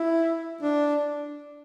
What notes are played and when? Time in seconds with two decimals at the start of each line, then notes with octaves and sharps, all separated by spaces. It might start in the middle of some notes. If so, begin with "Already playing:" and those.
Already playing: E4
0.62 D4